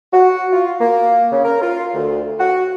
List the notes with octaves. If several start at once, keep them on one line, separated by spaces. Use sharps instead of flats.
F#4
F4
A#3
C#3
A#4
F4
D2
F#4